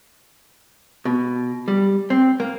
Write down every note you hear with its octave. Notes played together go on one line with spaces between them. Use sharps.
B2
G3
C4
A#3